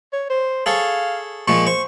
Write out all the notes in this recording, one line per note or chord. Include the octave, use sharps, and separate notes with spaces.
C#5
C5
G#4 A4 C#5 F5
A#2 F3 G#3 C#6
C5 C#6